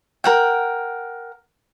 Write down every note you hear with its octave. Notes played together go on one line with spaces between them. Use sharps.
A#4 F#5 G5